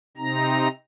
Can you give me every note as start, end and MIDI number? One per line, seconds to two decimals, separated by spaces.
0.17 0.68 48
0.17 0.68 60
0.17 0.68 63
0.17 0.68 82